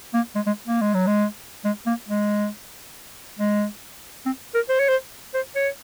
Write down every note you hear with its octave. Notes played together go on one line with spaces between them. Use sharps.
A#3
G#3
G#3
A#3
G#3
F#3
G#3
G#3
A#3
G#3
G#3
C4
A#4
C5
C#5
C5
C5
C#5